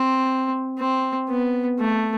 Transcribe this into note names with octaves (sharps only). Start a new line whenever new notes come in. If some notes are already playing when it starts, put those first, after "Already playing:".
Already playing: C4
C4
B3
A3